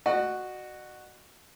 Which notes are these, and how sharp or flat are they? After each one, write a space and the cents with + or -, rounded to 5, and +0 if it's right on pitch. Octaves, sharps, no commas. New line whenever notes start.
F#4 +0 D#5 -45